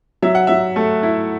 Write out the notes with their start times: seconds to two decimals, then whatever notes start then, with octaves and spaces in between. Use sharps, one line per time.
0.22 F#3 E5
0.35 F#5
0.47 F#3 E5
0.76 A3
1.03 E4